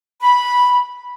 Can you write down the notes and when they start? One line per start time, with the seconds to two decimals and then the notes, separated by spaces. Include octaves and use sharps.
0.21 B5